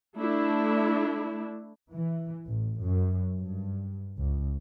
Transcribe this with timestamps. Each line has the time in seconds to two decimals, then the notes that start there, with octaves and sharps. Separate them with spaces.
0.17 A3 D4 E4
1.93 E3
2.46 A1
2.80 F#2
3.38 G2
4.18 C#2